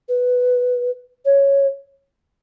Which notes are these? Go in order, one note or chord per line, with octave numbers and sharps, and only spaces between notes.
B4
C#5